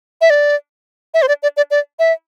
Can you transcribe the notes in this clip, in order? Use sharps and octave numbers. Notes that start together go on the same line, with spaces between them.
E5
D5
E5
C5
D5
D5
D5
D5
E5